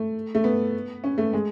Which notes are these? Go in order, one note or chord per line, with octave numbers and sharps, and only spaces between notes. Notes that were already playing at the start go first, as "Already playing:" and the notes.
Already playing: A3
A3
B3
C#4
A3
G#3